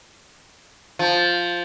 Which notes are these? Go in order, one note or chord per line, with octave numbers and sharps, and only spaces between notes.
F3